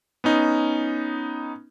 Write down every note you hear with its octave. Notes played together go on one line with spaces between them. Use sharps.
B3 C#4 D#4